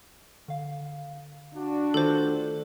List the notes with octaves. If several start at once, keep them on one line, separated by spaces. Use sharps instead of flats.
D3 F5
D4 F#4
D#3 A3 F4 A4 C5